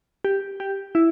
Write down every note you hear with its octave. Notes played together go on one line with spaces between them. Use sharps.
G4
G4
E4